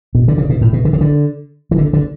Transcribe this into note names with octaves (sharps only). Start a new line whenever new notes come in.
B2
D3
C#3
B2
A2
B2
D3
C#3
D3
E3
D3
D3